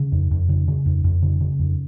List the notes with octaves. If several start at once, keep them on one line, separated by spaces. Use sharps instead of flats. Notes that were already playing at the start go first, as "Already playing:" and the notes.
Already playing: C#3
F2
F2
C#3
C#3
F2
F2
C#3
C#3
F2